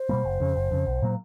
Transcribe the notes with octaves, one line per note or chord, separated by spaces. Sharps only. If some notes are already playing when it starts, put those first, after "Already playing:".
Already playing: C5
B2 G3 A#3
F#1
F2 C#3
F#1
F2 C#3
B1
A#2 F#3 A#3